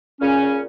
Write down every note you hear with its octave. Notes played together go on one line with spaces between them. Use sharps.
A#2 C#3 C#4
A#2